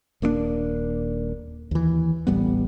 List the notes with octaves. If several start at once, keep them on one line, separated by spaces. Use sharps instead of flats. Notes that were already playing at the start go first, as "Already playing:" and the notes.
D#1 A#3 C4 D4
D#2 E3
D1 A1 G3 B3